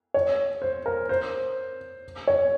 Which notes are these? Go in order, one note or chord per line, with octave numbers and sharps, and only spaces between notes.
C#5
C5
A#4
C5
C#5